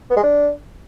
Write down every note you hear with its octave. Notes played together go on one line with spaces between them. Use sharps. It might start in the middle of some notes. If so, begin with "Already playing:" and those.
B3
G#3
D4